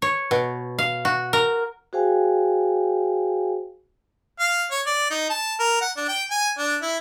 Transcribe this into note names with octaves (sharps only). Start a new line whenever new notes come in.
C#5
B2
F5
F#4
A#4
F#4 G#4 C5 F5 G5 G#5
F5
C#5
D5
D#4
A5
A#4
F#5
D4
G5
G#5
D4
E4